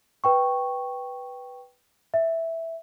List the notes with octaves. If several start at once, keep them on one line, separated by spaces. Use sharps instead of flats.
B4 G5 C#6
E5